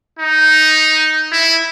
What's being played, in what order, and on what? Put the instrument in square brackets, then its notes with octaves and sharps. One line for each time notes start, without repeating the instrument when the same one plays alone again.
[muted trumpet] D#4
E4